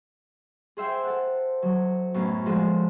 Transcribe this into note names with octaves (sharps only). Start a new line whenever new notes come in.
G#4 C5 E5 G5
A4 F#5
F#3
F#2 A2 B3 C#4
F3 G#3 F#4 A4